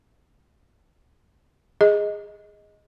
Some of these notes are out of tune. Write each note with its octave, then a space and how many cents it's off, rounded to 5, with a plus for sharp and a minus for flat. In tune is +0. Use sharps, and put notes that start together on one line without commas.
G#4 -10 D#5 +10